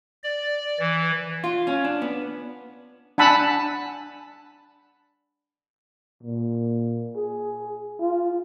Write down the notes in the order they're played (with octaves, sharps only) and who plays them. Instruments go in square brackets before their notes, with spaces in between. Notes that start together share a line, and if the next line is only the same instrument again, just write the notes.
[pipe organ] D5
E3
[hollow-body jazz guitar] F4
C#4
D4
B3
[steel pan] D4 F#5 G#5 A5 B5 E6
[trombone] A#2
G#4
F4